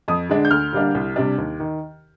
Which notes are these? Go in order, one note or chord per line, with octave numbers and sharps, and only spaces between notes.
F2 D#6
D3 G#3 D4
G6
D2 F6
D3 G3 A#3 D4
C2
C3 G3 D4
D#2
D#3